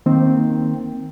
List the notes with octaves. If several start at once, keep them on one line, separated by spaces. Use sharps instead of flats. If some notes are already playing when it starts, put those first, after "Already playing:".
D#3 A#3 C4